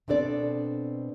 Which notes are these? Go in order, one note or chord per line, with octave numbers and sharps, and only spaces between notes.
B2 C4 D4 A4 D5